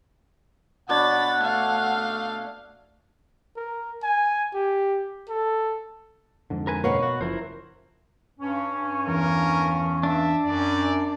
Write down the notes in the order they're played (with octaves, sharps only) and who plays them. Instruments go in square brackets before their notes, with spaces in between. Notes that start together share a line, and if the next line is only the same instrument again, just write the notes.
[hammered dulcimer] B2 D4 C#5 [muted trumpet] F#5 [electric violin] B5 A6
[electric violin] A3 F5
[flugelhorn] A#4
G#5
G4
A4
[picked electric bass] F2 G#2 D3
[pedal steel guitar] A#4 B4 G#5
[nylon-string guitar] B2 B4 C#5 [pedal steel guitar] A#4 F5 F#5
[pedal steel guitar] F#4
[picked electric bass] F#1 F3 [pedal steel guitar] E4 A#4 C5
[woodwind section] G2 C#4
[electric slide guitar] E2 [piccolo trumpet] A#4
[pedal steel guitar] D4 [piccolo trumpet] E5
[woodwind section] F#2 [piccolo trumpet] D5